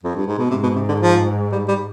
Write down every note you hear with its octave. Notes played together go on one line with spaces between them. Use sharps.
F2
G2
G#2
B2
G#2 C3
B2
C3
D3
F3
G3
G3